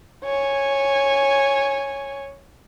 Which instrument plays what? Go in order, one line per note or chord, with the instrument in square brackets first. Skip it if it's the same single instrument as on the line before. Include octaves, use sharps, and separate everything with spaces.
[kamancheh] C#5 G#5